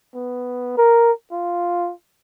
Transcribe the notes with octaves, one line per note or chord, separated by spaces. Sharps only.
B3
A#4
F4